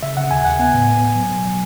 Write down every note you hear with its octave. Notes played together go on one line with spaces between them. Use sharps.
C#3 E5
C#3 F#5
D#2 G#5
D#2 F#5
B3 G#5
A2
B3
B3
F#3
B2
F#3